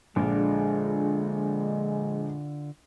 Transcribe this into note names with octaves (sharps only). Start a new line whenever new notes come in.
A#1 D3 G#3 D4 F4